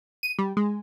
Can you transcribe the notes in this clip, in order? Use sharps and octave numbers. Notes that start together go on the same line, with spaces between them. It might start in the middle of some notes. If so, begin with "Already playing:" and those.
D#7
G3
G#3